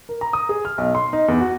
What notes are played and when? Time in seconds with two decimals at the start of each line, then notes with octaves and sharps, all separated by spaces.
0.09 A#4
0.21 A#5
0.33 D#6
0.49 G#4
0.65 F6
0.78 B1
0.95 C6
1.13 D#4
1.28 E2
1.41 F#4